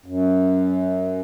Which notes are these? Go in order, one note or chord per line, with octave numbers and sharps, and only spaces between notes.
F#2